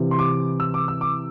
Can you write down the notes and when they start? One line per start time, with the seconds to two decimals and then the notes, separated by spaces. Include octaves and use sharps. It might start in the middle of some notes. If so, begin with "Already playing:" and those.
Already playing: C3 E3
0.11 C6
0.19 D6
0.60 E6
0.74 D6
0.88 E6
1.01 D6